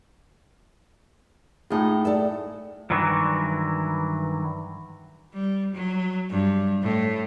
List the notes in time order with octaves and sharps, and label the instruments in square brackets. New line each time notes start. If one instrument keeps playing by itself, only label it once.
[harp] A2 G#4 [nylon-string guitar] D#4 F4
[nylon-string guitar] A4 D5 E5
[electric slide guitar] G2 D#3 E3 F#3
[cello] G3
F#3
G2
A2